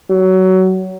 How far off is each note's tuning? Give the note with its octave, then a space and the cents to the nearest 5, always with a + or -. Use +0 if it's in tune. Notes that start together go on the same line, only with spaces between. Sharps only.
F#3 +20